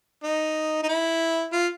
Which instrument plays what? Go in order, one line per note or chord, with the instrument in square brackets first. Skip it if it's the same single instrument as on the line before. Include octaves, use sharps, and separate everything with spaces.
[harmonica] D#4
D#4
E4
F4